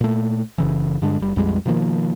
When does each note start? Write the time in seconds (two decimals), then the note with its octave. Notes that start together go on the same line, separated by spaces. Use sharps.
0.01 A#2 A3
0.58 F#1 C#3 E3
1.02 G2 D3 G#3 D4
1.20 F#1 G3
1.36 A#1 F2 G3 G#3
1.66 B2 D#3 F3 A#3